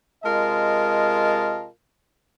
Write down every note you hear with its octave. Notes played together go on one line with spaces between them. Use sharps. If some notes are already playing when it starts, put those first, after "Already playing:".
C3 G#3 F4 A#4 D#5 A5